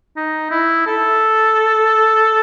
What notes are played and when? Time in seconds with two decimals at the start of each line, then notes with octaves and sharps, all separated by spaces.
0.17 D#4
0.51 E4
0.86 A4